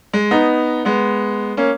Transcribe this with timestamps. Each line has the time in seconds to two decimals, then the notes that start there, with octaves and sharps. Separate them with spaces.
0.13 G#3
0.31 B3 D#4
0.85 G#3 B3
1.57 A#3 C#4